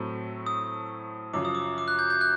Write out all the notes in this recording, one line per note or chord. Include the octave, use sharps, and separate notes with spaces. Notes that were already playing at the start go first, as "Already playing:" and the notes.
Already playing: A2 F#3 A3 C4
D#6
F#2 C#3 F3 D6
D#6
D6
D6
F#6
G6
G6
F#6